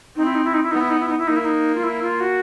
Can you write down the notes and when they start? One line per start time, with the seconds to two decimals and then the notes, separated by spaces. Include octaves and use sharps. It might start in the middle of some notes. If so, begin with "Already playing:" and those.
0.16 C4 D#4
0.25 E4
0.35 D#4
0.45 E4
0.54 D#4
0.63 E4
0.71 B3 D#4
0.80 E4
0.90 D#4
1.00 E4
1.09 D#4
1.18 E4
1.28 A#3 D#4
1.36 E4
1.45 D#4
1.75 F4
1.84 E4
2.02 F4
2.20 F#4